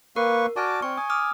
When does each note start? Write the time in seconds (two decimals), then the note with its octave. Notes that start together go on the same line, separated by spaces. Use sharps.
0.16 A#3 A#4 B4 C#6
0.56 F#4 D5 G#5 A5 D6 F6
0.82 C4 G#5 C#6
0.97 G#5 D#6
1.10 D6 D#6 F6